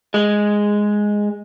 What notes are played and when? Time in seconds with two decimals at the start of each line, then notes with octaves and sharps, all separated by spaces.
0.14 G#3